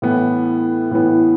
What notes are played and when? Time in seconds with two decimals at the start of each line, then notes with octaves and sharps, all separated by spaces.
0.02 A2 E3 B3
0.91 A2 E3 B3